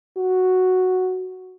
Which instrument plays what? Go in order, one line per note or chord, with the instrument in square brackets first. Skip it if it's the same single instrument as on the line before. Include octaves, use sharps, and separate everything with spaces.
[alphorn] F#4